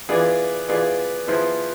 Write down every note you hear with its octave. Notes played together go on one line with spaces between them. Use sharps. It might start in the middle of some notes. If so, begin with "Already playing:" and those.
E3 B3 F4 G#4 D5
E3 B3 F4 G#4 D5
F3 B3 E4 G#4 C5